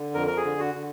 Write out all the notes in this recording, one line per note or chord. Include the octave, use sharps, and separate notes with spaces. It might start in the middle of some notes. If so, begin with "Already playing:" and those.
Already playing: D3
F2 A#4
A#4
G#4
D3
F#4
D3